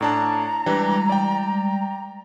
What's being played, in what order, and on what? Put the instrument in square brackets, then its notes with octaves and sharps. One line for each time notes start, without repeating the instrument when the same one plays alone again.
[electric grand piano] A2 D4 A5 [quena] A#5
[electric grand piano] E3 D4 G4 [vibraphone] G3 G#3
[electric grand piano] D5 G5